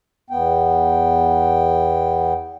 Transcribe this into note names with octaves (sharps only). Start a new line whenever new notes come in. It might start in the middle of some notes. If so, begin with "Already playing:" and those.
E2 B3 G5